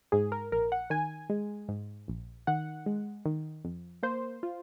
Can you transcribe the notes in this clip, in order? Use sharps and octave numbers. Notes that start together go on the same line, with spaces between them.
G#2 G#4
A#4
A#1 A#4
F#5
D#3 G#5
G#3
G#2
A#1
D#3 F#5
G#3
D#3
F2
A#3 C5
F4